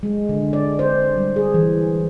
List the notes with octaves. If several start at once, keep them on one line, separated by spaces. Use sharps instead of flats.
G#3
D3
D5
C5
G3
G#4
E3